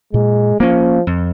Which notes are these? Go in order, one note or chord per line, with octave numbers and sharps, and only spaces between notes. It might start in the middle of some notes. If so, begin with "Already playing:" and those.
A#2 G#3
F3 A#3 C#4
F2